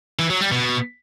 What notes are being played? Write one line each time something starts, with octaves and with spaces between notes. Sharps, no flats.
E3
F#3
G3
B2